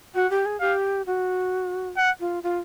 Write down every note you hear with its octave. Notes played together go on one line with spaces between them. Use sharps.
F#4 F#5
G4
G#4
G4 F5
F#4
F#5
F4
F4